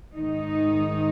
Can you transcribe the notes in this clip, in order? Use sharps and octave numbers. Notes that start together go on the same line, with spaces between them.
G#2 D#3 G#3 D#4